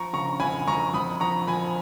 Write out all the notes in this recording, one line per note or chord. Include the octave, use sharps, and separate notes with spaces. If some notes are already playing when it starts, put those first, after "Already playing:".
Already playing: F3 A#5 C#6
C#3 A#5 C#6
F2 G#5 B5
F2 A#5 C#6
F2 B5 D#6
F3 A#5 C#6
F3 G#5 B5